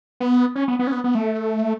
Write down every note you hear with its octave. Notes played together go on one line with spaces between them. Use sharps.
B3
C#4
B3
B3
C#4
B3
B3
A3